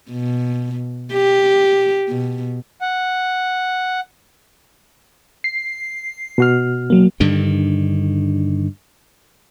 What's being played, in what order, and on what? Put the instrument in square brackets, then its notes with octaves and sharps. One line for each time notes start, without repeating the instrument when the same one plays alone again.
[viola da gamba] B2
G4
B2
[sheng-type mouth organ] F#5
[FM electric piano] C7
[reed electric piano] B2 F#4 F6
[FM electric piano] F#3 A#3
[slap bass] G2 D3 D#3